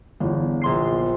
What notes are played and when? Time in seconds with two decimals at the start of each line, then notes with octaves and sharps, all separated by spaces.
0.20 G1 E2
0.62 A#1 C6 C7